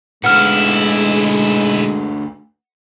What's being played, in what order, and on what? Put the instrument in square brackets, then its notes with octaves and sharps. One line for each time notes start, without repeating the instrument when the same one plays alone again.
[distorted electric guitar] B1 E4 [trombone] G#3 [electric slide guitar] A3 D4 B4 [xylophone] F#5 F6